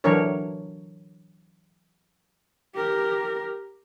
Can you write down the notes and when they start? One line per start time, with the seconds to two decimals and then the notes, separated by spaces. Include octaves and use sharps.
0.04 D3 E3 F#3 D4 A#4 C#5
2.75 G4 A#4